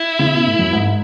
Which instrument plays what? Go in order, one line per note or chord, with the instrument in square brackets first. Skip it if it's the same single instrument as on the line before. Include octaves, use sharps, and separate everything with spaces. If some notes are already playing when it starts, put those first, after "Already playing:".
Already playing: [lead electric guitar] E4
[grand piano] C#3
B2
A2
F#2
G#2